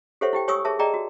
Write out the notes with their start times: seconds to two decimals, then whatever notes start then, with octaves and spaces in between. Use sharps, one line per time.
0.21 G4 A4 C5 C#5 E5 F#5
0.33 E4 G4 G5
0.48 G4 C#5 G#5 C#6 D#6 E6
0.65 G#4 A#4 C#5 E5 A5
0.79 G#4 D5 D#5 G5 A#5
0.94 F#4